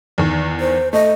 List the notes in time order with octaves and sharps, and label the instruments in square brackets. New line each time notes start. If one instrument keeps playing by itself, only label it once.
[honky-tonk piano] E2 D#3
[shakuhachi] C5
[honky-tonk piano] A3 [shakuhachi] D#5